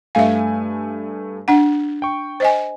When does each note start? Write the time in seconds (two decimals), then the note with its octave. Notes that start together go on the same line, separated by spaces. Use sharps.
0.15 G2 A3 E5 F5 G#5
1.48 D4 F#5
2.02 G5 C#6
2.40 C5 D#5 G#5